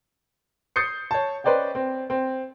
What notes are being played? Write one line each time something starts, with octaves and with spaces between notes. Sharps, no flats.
D#6 G6 A6 C7 C#7
C#5 A5
C#4 B4 C5 D5 D#5 G5
C4
C4